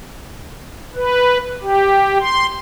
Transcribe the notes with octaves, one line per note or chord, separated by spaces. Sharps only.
B4
G4
C6